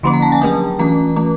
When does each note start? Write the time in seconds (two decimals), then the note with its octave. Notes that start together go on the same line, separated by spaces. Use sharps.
0.03 D3 F3 A#3 C#4 C6
0.13 A#5
0.22 A5
0.32 G#5
0.41 F#3 A3 D4 A5
0.79 E3 A3 C#4 A#5
1.16 E3 A3 C#4